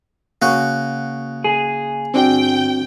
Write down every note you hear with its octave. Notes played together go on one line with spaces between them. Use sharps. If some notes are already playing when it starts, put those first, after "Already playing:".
C#3 A#3 F#4
G#4
G1 C4 D4 F#4 G5